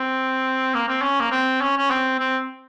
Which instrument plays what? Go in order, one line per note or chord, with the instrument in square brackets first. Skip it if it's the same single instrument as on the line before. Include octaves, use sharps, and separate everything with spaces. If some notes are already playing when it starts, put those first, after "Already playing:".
Already playing: [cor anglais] C4
A#3
C4
C#4
A#3
C4
C#4
C#4
C4
C4